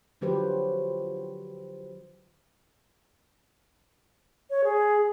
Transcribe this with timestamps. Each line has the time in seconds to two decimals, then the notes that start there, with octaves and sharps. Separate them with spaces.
0.21 D3 F3 F#3 G4 B4 C5
4.50 C#5
4.64 G#4